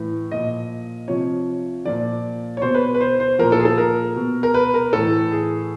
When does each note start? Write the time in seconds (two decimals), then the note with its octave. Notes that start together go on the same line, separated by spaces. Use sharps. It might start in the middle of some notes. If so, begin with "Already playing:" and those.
Already playing: A2 E3
0.31 A#2 F3 D#5
1.08 C3 F3 C#5
1.85 A#2 F3 D5
2.57 C#5
2.62 B2 C5
2.74 B4
2.94 B4
3.01 C5
3.20 C5
3.39 A#2 F3 A#4
3.52 A4
3.60 G#4
3.65 A4
3.78 A#4
4.16 B2
4.43 A#4
4.54 B4
4.74 A#4
4.93 A2 E3 A4
5.32 G#4